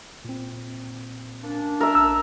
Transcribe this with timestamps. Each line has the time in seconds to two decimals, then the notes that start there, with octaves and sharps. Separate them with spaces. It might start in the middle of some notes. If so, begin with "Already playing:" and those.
0.25 A#2 C4
1.42 A#3 C#4 D4
1.80 A#4 E5
1.95 A#1 A5 E6